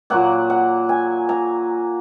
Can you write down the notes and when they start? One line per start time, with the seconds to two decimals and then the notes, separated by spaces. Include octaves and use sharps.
0.10 A#2 F#3 A#3 F#5
0.50 F#5
0.89 G#5
1.29 A#5